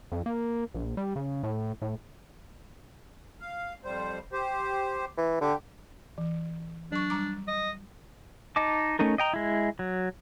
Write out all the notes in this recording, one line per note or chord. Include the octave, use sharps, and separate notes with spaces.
F2
A#3
A#1
G3
C#3
A2
A2
F5
F2 G3 C5
G4 C5
E3
D3 G4
E3
F#3 D4 C#6
G3 A#5 D6
D#5
D#4 D#5 A5 D6
A3 C#4 D#4 A#4
D#5 G5 A#5
G#3 E4
F#3